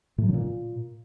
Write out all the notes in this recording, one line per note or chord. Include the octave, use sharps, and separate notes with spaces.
A2
F#3
D3
A#2